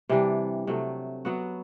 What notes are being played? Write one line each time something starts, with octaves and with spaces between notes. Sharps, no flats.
C3 E3 G3 D4
C3 F#3 A3
F#3 B3 F#4